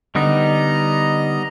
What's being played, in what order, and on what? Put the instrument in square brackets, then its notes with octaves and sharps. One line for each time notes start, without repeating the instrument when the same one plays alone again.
[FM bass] D3 [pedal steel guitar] G3 B3 D#4 [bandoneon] D#5 A#5